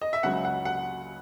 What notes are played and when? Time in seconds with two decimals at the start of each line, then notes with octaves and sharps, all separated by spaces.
0.02 D#5
0.13 E5
0.23 C#2 C#3 F#3 F#5
0.45 F#5
0.65 F#5